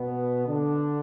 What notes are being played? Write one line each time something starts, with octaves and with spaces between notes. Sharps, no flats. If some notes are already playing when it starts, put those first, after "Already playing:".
Already playing: B2 B3
D3 D4